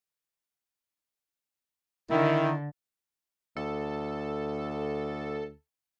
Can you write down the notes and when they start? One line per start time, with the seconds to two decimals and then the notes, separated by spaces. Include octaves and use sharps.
2.11 D3 D#3 E4
3.57 D2 A4